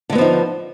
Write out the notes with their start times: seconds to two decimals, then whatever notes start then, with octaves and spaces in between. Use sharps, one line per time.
0.10 D3
0.12 G#3
0.15 B3
0.18 F3
0.21 D#4